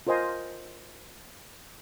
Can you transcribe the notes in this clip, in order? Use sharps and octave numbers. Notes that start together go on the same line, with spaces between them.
F4 A#4 C5 D#5 G#5 C6